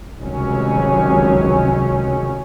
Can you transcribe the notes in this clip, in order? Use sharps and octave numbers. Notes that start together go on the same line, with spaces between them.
F1 C#2 D#3 F#3 C#4